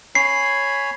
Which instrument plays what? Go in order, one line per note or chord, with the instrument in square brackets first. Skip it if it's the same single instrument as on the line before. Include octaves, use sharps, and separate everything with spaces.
[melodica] C#5 G#5 B5 [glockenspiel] C7